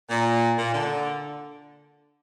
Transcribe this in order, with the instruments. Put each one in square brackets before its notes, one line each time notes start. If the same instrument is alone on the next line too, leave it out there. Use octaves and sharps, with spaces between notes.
[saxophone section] A#2
A#2
D3